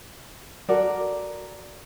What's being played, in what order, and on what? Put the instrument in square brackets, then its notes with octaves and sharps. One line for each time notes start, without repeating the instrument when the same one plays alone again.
[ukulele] F#4 A4 A#4 D5